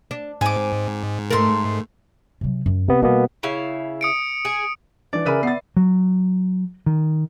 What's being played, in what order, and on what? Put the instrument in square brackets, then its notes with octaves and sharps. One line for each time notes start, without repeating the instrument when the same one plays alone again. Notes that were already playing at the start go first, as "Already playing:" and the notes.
[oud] D4
[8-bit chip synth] G#2 [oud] C4 [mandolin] G#5 D6
[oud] A3 A#4 [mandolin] A5 C6
[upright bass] C3 F#3
F#2
[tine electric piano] C3 B3 [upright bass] A#3
[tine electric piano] B2 A#3 B3 [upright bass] G3
[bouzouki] C#3 E4 F5
[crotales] D#6 C#7 D7
[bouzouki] G#4
[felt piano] E3 D4 [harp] D5
[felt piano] C#3 G#4 D#7 [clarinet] A#4 [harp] B4 E5 B5
[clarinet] B3 [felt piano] A6 C7
[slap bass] F#3
D#3